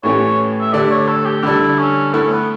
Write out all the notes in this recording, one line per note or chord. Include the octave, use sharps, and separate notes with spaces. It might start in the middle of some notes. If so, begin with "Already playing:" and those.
A2 E3 A3 C#4 G4 C#5
E5
D3 A3 D4 G4 D5
C#5
A4
G4
D3 G3 D4 E4 A4
C#4
A3 B3 E4 A4
C#4
B3